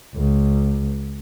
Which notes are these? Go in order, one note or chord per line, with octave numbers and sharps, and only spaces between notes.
C#2